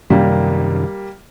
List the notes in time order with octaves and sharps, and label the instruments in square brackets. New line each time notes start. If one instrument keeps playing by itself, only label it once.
[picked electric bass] F#2 C3 D#3 [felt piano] G3 A#3